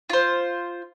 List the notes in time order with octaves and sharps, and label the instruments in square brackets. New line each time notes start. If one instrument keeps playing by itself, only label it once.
[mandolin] F4 C5